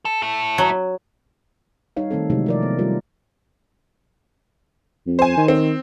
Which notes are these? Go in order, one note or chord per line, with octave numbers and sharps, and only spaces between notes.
A4
E4 A4
F#3
G3 D#4 C#5 F5
D#3 A3 C4 A4
C3 E3 F#3 G#3 A3 D#4
F3 A#4 D5
B3
G3 F4 A#4
F2
C5 G#5
D#3
C4